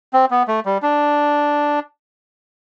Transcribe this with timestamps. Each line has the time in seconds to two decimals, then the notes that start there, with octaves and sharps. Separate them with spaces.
0.13 C4
0.31 B3
0.48 A3
0.66 G3
0.83 D4